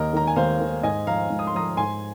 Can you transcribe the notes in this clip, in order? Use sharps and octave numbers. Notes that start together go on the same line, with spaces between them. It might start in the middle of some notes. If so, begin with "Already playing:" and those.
Already playing: D#2 A#4 D#5
D#3 A#5
G#5
D#2 C5 F5
D#3
G#2 D#5 G#5
F3 F5 A#5
G#2
D#6
C6
F3 A#5 D#6
G#2 G#5 C6